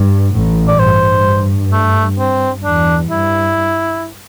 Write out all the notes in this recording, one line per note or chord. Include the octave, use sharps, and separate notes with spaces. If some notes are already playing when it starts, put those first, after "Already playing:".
Already playing: G2
A1 A2
D5
G2 C5
A3
C4
E2 D4
G2 E4